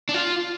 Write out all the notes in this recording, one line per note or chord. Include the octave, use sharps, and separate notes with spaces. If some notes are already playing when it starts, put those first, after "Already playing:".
D4
F4